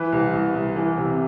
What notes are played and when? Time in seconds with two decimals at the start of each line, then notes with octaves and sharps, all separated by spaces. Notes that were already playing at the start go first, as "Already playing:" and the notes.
Already playing: E3 B4
0.12 C2
0.33 C2
0.55 C2
0.76 E3
0.98 C3